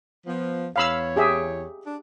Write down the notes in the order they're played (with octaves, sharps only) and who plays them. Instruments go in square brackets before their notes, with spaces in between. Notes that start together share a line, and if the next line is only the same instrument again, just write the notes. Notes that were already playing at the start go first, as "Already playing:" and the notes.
[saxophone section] F3 B3
[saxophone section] E2 C#5 [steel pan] F5 B5 E6
[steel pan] G4 G#4 E5
[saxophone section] D4